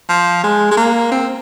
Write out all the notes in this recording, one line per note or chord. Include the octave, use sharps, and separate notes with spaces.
F3
G#3
G#3
A#3
C4